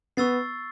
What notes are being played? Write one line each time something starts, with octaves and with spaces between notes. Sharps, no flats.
B3 C#6 E6 A6 C7